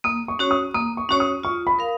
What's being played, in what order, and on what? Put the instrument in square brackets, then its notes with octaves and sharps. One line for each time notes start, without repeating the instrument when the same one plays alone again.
[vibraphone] A#3 [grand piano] D#6
[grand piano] C#6
[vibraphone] C#4 F#4 C#5
[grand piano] D#6
[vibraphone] A#3 [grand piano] D#6
[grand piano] C#6
[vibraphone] C#4 F#4 C#5 [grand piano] C#6
[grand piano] D#6
[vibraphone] F4 [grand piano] C#6
[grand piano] B5
[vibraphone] A#4 F5